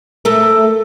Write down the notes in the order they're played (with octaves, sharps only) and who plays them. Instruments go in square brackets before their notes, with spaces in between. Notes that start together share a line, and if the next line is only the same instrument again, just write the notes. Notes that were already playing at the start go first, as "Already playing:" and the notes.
[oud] A3 A4 A#4